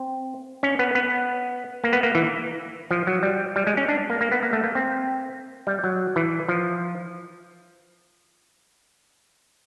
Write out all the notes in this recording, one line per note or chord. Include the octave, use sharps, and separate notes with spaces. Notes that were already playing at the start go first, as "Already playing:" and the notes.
Already playing: C4
C#4
B3
B3
A#3
B3
A#3
E3
F3
F#3
G3
G3
G#3
C#4
D4
A#3
A#3
B3
A#3
A3
A#3
C4
G3
F#3
E3
F3